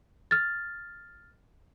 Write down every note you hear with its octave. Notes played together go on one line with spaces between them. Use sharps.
F6 A6